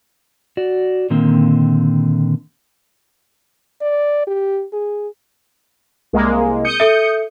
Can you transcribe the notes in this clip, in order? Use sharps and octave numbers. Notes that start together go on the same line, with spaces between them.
F#4 D5
A#2 D3 D#3 A#3 C4
D5
G4
G#4
C2 G#3 A#3
D#6 G6 C#7
A4 E5